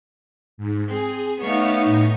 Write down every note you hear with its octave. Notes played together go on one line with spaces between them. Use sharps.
G#2
C4 G#4
A3 B3 D#4 C#5 F5 C#6
A2 D#4